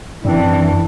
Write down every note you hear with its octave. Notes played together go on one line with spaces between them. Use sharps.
F#2 E3 G3 C4 D4